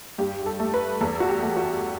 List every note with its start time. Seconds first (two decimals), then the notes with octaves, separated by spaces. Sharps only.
0.18 G2 G4
0.42 G4
0.46 A4
0.59 A3
0.74 B4
1.01 E2 A4
1.20 F#4
1.29 G4
1.42 A3
1.57 F#4